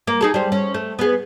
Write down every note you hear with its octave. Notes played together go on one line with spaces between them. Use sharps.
A#3
D#4 G#4 A4
G3 C5
C#4
A3
B3 G#4